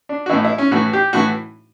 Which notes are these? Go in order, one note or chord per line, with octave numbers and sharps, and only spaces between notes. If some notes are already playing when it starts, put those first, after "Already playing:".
D4
F#4
A2 E3 E4
E4
C#4
A2 E3 F#4
G4
A2 E3 F#4